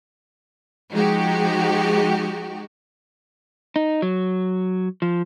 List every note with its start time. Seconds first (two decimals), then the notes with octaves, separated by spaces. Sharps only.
0.92 F3 G#3 D#4 F#4 G4
3.76 D#4
4.02 F#3
5.02 F3